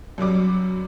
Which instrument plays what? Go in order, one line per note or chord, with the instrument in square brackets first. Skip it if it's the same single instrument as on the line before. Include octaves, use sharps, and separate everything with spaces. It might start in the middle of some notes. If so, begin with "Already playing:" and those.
[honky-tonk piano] F#2 F#3 G3 D6